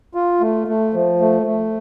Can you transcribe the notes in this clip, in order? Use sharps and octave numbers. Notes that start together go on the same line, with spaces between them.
F4
A3
A3
F3
A3
A3